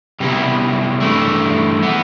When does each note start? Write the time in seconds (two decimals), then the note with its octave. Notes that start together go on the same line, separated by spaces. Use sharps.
0.20 C3 G3 B3 E4
1.00 G2 E3 A3 E4
1.83 E3 B3